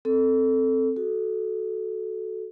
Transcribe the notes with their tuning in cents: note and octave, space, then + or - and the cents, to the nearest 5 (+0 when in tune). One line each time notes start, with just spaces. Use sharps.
C4 +0 A4 +0
F#4 +0 A4 -15